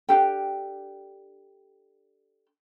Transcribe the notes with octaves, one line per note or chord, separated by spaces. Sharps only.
D4 G4 A4 G5